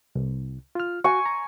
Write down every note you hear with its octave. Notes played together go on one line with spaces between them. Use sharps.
C2
F4 F6
F#4 G#5 C#6
A#5